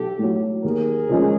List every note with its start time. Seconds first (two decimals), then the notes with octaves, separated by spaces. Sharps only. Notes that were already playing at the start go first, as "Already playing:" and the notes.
Already playing: B1 G4 A4
0.19 A2 F#3
0.63 D#2 G#4 A#4
1.09 C#3 F3 G#3 C#4